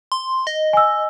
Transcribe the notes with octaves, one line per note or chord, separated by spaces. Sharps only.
C6
D#5
G#5 E6